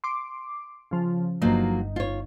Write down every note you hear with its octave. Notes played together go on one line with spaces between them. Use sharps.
C6 D6
C#3 F3
G1 F3 F#3 A#3 D#4
F4 C#5